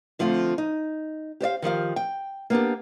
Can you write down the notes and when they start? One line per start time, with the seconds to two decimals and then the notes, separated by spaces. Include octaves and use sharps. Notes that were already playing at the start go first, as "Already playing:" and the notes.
0.19 D3 F3 A3 C4 F4
0.58 D#4
1.40 G4 C5 D5 F5
1.62 D#3 F3 G4 F5
1.96 G5
2.50 A#3 B3 D4 G4